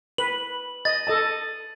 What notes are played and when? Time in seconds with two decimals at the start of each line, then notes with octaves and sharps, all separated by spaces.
0.18 B4 F#7
0.85 D#5 A6
1.07 A4 D#5 A5